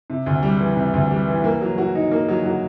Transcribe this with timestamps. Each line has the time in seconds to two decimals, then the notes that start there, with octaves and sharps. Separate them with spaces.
0.10 C3
0.26 D2
0.43 G3
0.60 E3
0.76 C3
0.94 D2
1.11 G3
1.27 E3
1.44 A#3
1.61 F#3
1.78 F#4
1.95 D#4
2.11 A#3
2.29 F#3
2.45 F#4